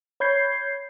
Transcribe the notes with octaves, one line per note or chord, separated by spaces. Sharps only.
C#5 B5 G6 G#6 C7